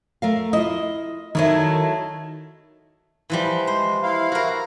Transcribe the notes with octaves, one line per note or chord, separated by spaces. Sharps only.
A3 A#4 F5
E4 F4 D#5
D#3 F#3 A3 D#4 E4 D#5
E3 F3 G3
G#3 C5
E4 F5
F#4 A#4